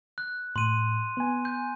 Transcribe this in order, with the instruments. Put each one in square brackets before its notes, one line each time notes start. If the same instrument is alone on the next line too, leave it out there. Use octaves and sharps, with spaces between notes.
[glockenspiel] F#6
[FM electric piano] A2 [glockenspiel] C6 D#7
[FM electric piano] B3 G#5
[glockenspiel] G6